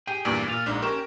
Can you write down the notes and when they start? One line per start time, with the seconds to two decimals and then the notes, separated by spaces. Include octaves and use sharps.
0.07 G4 G#4 G5
0.25 E2 G2 A#2 D5
0.47 A#2 F4 F5
0.66 A#1 G#2 D4
0.82 C#4 G4 A#4 C#6 E7